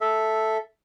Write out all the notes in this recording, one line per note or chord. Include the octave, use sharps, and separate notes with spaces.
A4 E5